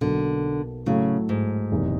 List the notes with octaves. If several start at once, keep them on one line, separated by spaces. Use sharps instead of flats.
B1 B2 D3 F#3 A#3
A2 C#3 F#3 A3
G#2
F#1 E2 C3 D#3 G#3